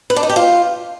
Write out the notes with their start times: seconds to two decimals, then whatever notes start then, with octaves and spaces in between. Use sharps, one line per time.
0.10 B4
0.16 D4
0.23 D#4
0.29 G4
0.36 F4